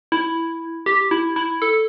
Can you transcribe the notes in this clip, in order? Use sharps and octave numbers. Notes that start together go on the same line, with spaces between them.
E4
G4
E4
E4
A4